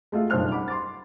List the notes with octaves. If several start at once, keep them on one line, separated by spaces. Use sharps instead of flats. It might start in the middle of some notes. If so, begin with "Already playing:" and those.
G#3 A3 F4 F#4
F#1 B1 G2 C5 F6 F7
F#5 B5 D6
C6 D6 A6